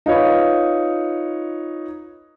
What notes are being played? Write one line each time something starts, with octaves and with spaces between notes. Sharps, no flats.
D#4 F4 B4 C#5